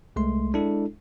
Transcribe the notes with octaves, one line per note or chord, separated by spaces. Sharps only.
C2 G#3 A3 C6
G#3 D4 E4 A4